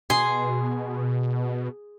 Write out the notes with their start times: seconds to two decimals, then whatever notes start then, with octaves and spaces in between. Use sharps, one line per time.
0.10 B2 G#4 C6